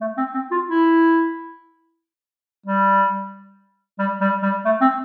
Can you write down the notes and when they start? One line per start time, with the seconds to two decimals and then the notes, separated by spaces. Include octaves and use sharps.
0.01 A3
0.17 C4
0.34 C4
0.51 F4
0.67 E4
2.66 G3
3.99 G3
4.21 G3
4.42 G3
4.65 A3
4.81 C4